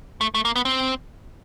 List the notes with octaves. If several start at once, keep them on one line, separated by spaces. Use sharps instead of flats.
A3
A3
A#3
B3
C4